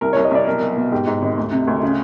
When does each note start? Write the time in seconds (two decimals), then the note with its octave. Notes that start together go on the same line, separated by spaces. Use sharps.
0.01 C2 A#4
0.13 C2 C#5
0.24 D#5
0.31 C2 D5
0.47 B1 A#4
0.62 B1
0.77 B2
0.92 G#2 G4
1.07 G#2
1.22 G#1
1.37 D2
1.52 C3
1.67 D2
1.83 C#3